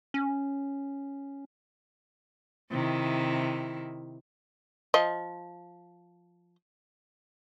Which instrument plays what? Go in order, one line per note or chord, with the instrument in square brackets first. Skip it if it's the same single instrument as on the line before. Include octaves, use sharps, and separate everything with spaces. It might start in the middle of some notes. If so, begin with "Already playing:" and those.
[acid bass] C#4
[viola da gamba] C3 D#3 E4
[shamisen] F3 D#5